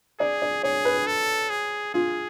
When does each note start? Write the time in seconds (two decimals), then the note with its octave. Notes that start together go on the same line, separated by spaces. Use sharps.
0.20 G#4 D5
0.42 D5
0.63 G#4 C#5
0.85 B4
1.07 A4
1.50 G#4
1.94 F4 G#4